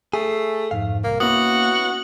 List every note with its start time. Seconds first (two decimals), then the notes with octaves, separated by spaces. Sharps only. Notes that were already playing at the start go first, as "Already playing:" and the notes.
0.14 A3 G#4 C7
0.71 F2 G#2 C#3 F5
1.04 C2 A#3
1.20 A#3 B3 C#4 E4 F#4 D#6 F#7